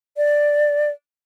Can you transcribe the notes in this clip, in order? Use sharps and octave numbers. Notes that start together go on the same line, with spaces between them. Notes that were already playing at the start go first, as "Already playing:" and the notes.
D5